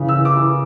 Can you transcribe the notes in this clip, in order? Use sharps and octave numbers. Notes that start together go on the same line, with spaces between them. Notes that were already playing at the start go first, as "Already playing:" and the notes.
Already playing: C#3 E3
E6
E3
D6
E3